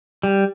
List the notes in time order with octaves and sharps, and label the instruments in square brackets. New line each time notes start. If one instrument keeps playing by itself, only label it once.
[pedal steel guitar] G3